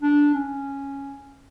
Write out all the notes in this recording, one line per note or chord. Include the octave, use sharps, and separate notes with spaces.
D4
C#4